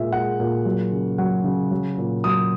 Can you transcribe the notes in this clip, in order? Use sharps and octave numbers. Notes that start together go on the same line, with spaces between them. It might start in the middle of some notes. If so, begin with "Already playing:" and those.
Already playing: A#2 G#3 E5
G#3 F#5
A#2
F#3
C#3
F#3 F#5
C#3
F#3
A#2
F#3 D#6